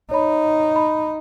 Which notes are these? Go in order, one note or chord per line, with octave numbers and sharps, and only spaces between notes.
D#4 C#5 B5
B5